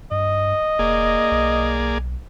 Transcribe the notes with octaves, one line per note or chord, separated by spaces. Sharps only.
G2 D#5
E1 A#3 G#4 D5
B1